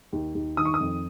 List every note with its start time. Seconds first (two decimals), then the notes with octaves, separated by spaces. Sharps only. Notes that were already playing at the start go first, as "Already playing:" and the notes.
0.13 D#2
0.35 D#2
0.57 D#3 D#6
0.65 C#6
0.74 D#6
0.80 F2